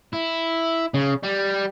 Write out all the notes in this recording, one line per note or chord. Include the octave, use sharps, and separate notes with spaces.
E4
C#3
G3